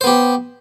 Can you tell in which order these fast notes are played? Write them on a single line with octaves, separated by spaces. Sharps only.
C5 B3 G4